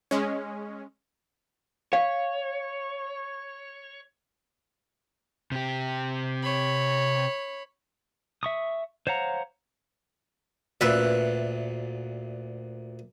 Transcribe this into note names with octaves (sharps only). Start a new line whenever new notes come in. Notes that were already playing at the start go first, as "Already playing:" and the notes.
G#3 C#4
C#5 F5
C3 G4
C#5 B5
E5 C#6 D#6
C5 C#5 F5 F#5 A#5
D2 A#2 B4 E5